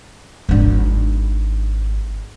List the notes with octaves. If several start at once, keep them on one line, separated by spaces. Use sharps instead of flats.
G#1 D4